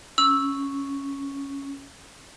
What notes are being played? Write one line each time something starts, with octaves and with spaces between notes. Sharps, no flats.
C#4 E6